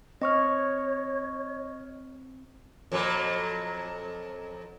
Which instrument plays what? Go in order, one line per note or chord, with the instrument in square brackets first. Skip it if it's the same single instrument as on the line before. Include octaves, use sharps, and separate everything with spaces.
[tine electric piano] C4 [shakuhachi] C#5 [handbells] D#5 C#6 F6
[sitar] F2 A#2 F#3